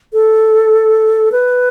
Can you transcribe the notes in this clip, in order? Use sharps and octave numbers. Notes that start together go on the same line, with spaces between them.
A4
B4